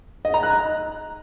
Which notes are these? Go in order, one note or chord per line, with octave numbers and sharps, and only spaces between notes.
D#5
A#5
F#6